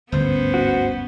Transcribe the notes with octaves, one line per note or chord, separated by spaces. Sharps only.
G1 D2 G#2 B3 C#4 C5
F#4